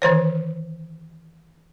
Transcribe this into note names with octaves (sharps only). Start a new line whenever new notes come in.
D#3 E3 C5 C#5